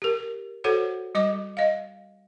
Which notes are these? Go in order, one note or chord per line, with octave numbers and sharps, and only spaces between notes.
G4 A#4
F#4 A4 C5 C#5 F#5
G3 D#5 D6
D#5 F5